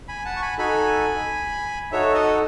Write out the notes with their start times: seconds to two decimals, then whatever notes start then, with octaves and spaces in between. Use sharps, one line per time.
0.08 G#5 B5
0.25 F#5 A5
0.37 C#6
0.42 G#5 B5
0.58 D#4 F#4 A4 G#5 B5
1.92 D#4 F#4 A4 C#5 E5
2.14 D#5 F#5